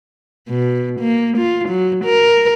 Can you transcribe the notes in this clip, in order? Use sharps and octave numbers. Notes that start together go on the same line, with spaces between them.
B2
A#3
F4
F#3
A#4